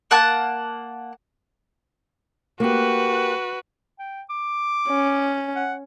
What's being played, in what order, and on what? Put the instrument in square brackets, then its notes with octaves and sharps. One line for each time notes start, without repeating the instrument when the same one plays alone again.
[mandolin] A#3 F#5 A5 F#6
[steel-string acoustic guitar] A#3 G4 [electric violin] F#4 B4
[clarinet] G5
D6
[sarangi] C#4
[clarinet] F#5